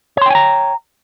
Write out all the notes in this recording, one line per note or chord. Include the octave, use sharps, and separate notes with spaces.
C#5 G5 G#5 A#5 C6